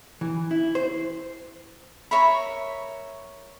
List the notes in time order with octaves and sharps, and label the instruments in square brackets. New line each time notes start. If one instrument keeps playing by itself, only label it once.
[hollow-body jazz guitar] E3
E4
C5
[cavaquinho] A#4 C#5 E5 B5